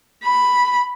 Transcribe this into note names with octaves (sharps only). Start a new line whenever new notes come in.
B5